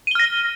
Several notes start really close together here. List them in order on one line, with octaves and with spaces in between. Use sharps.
D#7 G7 F6 A#6